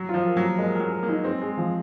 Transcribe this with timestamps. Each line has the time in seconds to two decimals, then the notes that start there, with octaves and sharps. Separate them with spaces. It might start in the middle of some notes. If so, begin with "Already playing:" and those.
Already playing: F#3
0.09 F4
0.14 F3
0.26 A#4
0.37 F#3
0.42 A#3
0.58 G#3 A#4
0.75 F#3 A#4
0.92 A#4
1.03 A#3
1.09 D#4
1.24 G#3 C4
1.42 G#3
1.57 F3